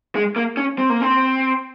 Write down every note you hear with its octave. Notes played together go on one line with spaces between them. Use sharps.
G#3
A#3
C#4
C4
A#3
C4